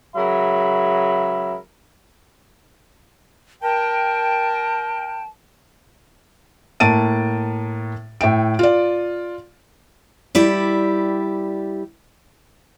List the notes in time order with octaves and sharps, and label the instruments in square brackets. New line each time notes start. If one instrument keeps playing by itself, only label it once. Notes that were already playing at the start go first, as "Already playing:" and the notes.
[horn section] C#3 F#3 G#3 A#4 E5 B5
[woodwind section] A#4 G5 [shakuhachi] A5
[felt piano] A2 A#3 A5 A6 D7 D#7
A2 E5 G5 D7
F4 D5
[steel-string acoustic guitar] G3 E4 G4 D5